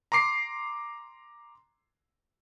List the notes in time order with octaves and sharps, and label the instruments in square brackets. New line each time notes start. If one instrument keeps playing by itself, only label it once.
[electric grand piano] A#5 C6 D6 C7